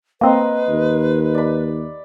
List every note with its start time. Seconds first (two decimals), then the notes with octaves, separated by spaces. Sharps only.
0.21 A#3 C4 B4 D#5 A#5 C6
0.68 D#2
1.35 D5 B5